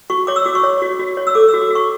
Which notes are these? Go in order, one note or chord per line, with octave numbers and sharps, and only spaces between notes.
F#4 C#6
C#5 D6
E6
F#4 D6
C#6
C#5
F#4
F#4
C#5
E6
A4 D6
E6
F#4
D6
F#4 C#6